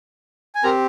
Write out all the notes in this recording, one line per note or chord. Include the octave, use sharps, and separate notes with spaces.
G#5
C4 G4 A#4 A#5